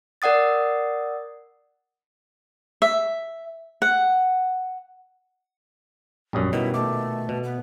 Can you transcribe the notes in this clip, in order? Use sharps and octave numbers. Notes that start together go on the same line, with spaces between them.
A#4 D5 F#5 D#6 A6
E5
F#5
A#1 F#2 G3 C#4 D#6
B2 D#3 E4
A#2 A3 D6
B2
B3